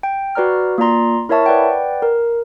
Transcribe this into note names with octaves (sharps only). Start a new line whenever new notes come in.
G5
F#4 B4 D5 A#5 F6
A#3 F4 D5 A#5 C6
E4 A#4 C#5 E5 A5 C#6
B4 D5 F#5 G5
A#4